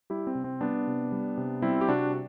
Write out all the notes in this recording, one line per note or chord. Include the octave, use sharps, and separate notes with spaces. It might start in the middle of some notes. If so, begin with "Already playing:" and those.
G3 E4 G4
C4
C3
C4
G3 B3 D4
C3
G3
C3
G3 C4 E4
G4
C3 D4 F#4